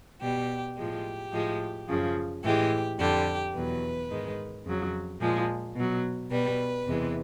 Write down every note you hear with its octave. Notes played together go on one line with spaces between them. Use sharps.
B2 G3 G4
A2 F3 G#3 G4
A2 F3 G#3
F#2 C#3 F3
A2 E3 G#3 G4
F2 D3 G3 G4
E2 B2 F#3 B4
G#2 D#3 G#3
F2 C#3 F#3
A#2 F3 G#3
B2 F#3
B2 G3 B4
E2 C3 E3 G#3